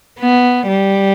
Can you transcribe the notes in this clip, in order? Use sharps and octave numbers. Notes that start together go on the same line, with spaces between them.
B3
G3